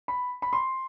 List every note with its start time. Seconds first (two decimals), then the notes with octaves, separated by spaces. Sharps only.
0.08 B5
0.42 B5
0.53 C6